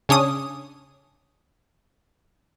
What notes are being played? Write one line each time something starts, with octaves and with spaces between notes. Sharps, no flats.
C#3 C#4 D4 D#6